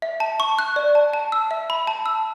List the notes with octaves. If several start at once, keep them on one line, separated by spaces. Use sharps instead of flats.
E5
A5
C#6
F#6
D5
A5
A5
E6
E5
B5
A5
E6